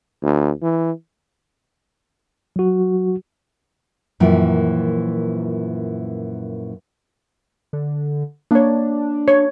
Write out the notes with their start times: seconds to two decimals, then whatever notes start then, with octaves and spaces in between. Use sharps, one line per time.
0.23 D2
0.62 E3
2.56 F#3 F#4
4.20 F#2 A#2 E3 F3 G5
7.73 D3
8.51 A#3 D4 C#5
9.28 C#5